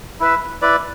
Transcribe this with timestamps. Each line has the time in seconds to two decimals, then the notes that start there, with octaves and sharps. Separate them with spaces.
0.20 E4 B4 E5
0.62 E4 B4 D5